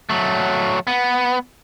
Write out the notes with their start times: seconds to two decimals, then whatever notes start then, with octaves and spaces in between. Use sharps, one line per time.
0.09 F#3 A3
0.87 B3